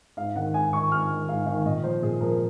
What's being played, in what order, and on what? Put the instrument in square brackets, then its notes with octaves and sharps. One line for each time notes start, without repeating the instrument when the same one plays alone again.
[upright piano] G#2 F5
D#3 F#5
G#2 G#5
D#3 C#6
G#2 F6
D#3
G#2 F5
D#3 F5
A#2 D#5
F3 C5
A#2 G#4
F3 A#4